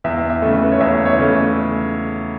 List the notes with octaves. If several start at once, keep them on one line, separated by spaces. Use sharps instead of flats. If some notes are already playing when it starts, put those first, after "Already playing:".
E2 E5
E5
C#3 A3
B4
C#5
E2 E5
E5
C#5
C#3 A3